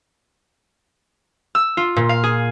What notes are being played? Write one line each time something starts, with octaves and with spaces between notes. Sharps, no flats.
E6
F4
A#2
F5
G#4